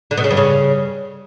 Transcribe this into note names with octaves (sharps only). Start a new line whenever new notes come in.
D3
B2
C#3
G2
C#3